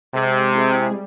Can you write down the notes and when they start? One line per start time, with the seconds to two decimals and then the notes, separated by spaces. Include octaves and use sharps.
0.14 C3 G#3
0.53 C4 E4 G#4
0.91 G3